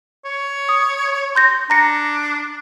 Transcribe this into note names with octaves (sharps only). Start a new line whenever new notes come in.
C#5
D#6
C6 G6 A#6
D4 A#5 A#6 C#7